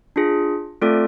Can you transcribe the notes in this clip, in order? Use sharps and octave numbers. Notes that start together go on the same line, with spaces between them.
D4 F4 G#4
A3 C4 F4 A4 D5